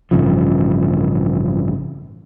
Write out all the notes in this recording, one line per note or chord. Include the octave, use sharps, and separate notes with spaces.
A1 G2 C#3 F3